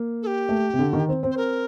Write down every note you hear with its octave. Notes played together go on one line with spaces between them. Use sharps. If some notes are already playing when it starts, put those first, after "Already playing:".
Already playing: A#3
A4
G4
A3
C3
D3
D#3
C4
C4
C5
A#4